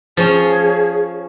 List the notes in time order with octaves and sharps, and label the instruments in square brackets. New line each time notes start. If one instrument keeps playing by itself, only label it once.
[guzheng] F3 C#4 [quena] G#4